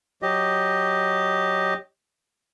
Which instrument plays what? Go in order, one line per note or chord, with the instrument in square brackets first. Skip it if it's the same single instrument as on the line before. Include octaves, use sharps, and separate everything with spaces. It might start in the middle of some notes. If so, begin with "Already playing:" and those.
[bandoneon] F#3 G4 D#5